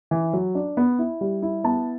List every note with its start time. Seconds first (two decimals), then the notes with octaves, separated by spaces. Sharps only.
0.11 E3
0.33 F#3
0.55 D4
0.77 B3
0.99 E4
1.21 G3
1.42 E4
1.64 B3 A5